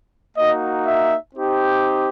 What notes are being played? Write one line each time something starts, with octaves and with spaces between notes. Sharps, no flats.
A#3 D#4 F#4 D#5
E5
C4 D#4 G4